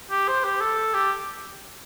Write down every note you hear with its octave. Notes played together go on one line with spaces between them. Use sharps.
G4
C5
G4
A4
G4